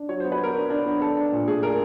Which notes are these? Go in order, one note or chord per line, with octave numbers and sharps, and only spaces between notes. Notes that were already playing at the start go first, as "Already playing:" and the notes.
Already playing: D4
F#3 C#5
B3 C5
B4
B3 A#4
D4
D4
B3
D4 A4
D4
A#2
A3 G#4
D4 A#4